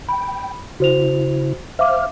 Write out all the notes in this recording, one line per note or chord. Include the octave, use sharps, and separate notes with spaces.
G5 B5
C#3 E4 F#4 C5 F7
C5 E5 F5 D6 F6